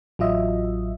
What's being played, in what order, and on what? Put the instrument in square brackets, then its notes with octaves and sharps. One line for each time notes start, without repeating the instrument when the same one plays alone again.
[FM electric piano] A1 F#3 F4 D#5 E5